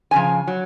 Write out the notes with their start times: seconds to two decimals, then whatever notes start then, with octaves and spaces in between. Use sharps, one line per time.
0.11 F#2 C#3 F3 G#5
0.47 F#3